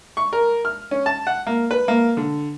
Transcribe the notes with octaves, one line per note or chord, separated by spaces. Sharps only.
C#6
A#4
F6
C#4
A5
F#5
A#3
B4
A#3
D3